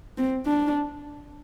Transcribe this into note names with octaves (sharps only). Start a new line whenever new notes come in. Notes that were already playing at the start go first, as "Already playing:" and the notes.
C4
D4